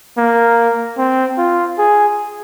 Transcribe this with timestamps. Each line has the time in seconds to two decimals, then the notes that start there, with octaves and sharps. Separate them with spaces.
0.18 A#3
0.98 C4
1.38 F4
1.78 G#4